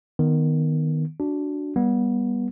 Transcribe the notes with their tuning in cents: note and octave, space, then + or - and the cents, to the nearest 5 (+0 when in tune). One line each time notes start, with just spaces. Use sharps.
D#3 +0 B3 +0
D4 -5 F#4 +0
G3 +0 B3 -25